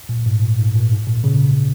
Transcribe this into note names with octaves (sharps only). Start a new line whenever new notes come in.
A#2
G#2
A#2
G#2
A#2
G#2
A#2
C#3